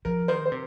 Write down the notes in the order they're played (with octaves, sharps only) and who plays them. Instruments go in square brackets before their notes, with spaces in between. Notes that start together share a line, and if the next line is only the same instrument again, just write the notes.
[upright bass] F3 [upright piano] A#4
[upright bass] D#3 [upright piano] C5
[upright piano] C5
[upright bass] C3